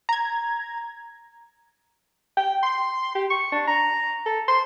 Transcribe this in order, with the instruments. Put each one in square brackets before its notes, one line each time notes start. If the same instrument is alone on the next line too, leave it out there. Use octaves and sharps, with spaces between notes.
[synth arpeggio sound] A#5 G#6
[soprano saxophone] G5
C6
G4
C#6
D4
A#5
A4
C6